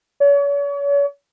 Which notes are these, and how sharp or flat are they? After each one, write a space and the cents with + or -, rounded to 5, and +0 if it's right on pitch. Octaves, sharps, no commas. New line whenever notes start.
C#5 +40